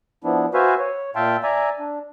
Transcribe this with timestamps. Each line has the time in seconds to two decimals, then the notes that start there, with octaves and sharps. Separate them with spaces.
0.24 F3 B3 D4 E4
0.54 F#4 B4 C5 E5 F5 G#5
0.79 C#5
1.15 A#2 E5 F5 G5 A5 C6
1.43 D5 E5 G#5 A#5
1.79 D4